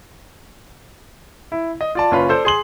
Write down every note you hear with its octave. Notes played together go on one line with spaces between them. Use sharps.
E4
D#5
F4 D5 A5
F#1 C#4 F4 B4
A4 C5 D5
G#4 C6 F#7